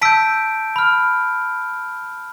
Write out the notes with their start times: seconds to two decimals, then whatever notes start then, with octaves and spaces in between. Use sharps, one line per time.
0.02 A5 E6 G6 B6 D7
0.76 B5 F6